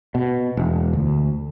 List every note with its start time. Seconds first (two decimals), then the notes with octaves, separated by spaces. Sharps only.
0.15 B2
0.57 E1
0.93 D2